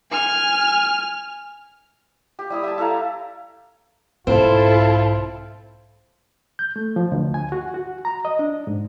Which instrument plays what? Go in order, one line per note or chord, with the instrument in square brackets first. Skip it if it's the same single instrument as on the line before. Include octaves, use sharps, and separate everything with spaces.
[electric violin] G#5 F6
[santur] G4
G3 E4 D#6
E5 G5 A5
E4 A4 F5 A#5
[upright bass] B1 G#2 [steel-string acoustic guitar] C4 [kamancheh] E4 A4 [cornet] F4
[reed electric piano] G6
A3
F3
D2
G#5
F#4
F#4
A#5
D#5
D4
G#2